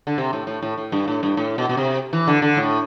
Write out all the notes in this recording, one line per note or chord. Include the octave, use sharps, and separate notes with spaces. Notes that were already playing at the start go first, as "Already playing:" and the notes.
D3
C3
A2
A2
A2
A2
G2
A2
G2
A2
B2
B2
C3
E3
D3
D3
A2